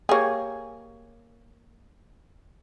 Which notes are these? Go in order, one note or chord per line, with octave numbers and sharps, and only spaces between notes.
A#3 G4 G#4 C#5